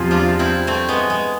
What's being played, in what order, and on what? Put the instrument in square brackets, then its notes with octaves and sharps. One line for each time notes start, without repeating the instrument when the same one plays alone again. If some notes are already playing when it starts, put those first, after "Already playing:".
Already playing: [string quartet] E2 C3 F3 [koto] G#4
[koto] D4 F4
C4 E4
A3 C4
G#3 B3
G#3